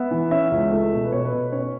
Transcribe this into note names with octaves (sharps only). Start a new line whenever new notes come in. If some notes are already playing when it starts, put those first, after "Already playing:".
Already playing: B3 E5
E3
C#4 E5
C#2
A3
B2
B4
B2 C#5
B4
B2
C#4 C#5